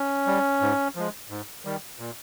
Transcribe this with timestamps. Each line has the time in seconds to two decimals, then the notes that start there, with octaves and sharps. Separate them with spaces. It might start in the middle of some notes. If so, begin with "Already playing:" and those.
Already playing: C#4
0.27 G3
0.61 G#2
0.96 F3 G#3
1.29 G#2
1.65 D#3 G3
1.99 A#2